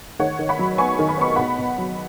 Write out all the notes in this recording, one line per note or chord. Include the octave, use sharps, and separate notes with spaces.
D#3 C#5 F#5
D#3
F#5 B5
F#3
B3 G#5 C#6
D#3
B5
B3 C#6
B2 F#5 B5
B2
F#3